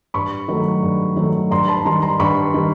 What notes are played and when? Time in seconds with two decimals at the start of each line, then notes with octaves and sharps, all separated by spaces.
0.14 G2 B5 C#6
0.48 D#3 F#3 A3
0.83 G2
1.16 D#3 F#3 A3
1.51 G2 A#5 C6
1.68 A5 B5
1.85 D#3 G3 A#5 C6
2.02 A#5 C6
2.20 G2 B5 C#6
2.54 D#3 G3